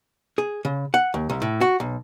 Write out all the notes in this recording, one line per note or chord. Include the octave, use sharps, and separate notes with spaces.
G#4
C#3
F#5
D#2
C2
A2
F#4
B1